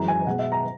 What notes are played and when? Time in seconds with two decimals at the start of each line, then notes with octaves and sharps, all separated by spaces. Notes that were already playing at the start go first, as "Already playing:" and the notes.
Already playing: F#2 E3 G#3 A#5
0.08 G#5
0.27 B2 G#3 F#5
0.39 E5
0.52 A#5